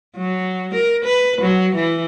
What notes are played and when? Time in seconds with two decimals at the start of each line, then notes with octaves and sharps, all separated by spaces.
0.17 F#3
0.75 A#4
1.05 B4
1.42 F#3
1.76 E3